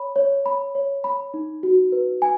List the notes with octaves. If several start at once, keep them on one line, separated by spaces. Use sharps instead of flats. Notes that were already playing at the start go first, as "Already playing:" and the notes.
Already playing: C#5 B5
C#5
B5
C#5
B5
D#4
F#4
B4
G#5